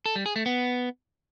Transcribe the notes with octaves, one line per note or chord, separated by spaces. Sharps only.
A4
G3
G#4
A3
B3